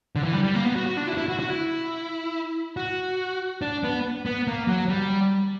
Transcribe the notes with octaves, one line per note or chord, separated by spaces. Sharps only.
D3
E3
G3
G3
A#3
B3
F#4
F#4
D4
E4
F#4
E4
F#4
F#4
E4
F#4
D4
B3
B3
A#3
F#3
G3